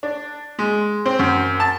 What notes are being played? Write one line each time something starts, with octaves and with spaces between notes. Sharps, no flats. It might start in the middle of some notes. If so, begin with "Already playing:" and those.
D4
G#3
C4
F#2
A5